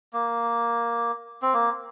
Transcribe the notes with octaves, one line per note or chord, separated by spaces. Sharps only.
A#3
C4
A#3